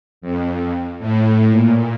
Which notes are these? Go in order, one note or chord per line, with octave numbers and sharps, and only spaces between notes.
F2
A2
A#2